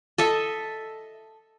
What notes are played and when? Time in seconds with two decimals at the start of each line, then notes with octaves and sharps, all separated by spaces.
0.18 A4 D#5 E5